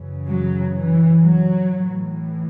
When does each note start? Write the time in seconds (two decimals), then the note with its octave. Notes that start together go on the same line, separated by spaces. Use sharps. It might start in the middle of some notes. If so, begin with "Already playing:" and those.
Already playing: F#2 C#3 E3
0.27 F#3
0.74 E3
1.22 F#3
1.69 A2 E3